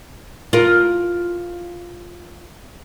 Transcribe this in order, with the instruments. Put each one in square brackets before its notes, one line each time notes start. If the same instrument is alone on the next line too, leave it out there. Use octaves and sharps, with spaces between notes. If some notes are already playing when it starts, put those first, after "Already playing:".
[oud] F4 A#4